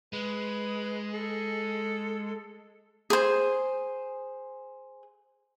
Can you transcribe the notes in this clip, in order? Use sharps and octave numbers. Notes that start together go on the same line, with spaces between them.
G#3 B4
A4
G#4 C5